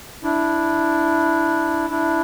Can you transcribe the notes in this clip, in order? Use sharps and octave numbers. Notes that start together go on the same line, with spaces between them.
D4 E4
D4 E4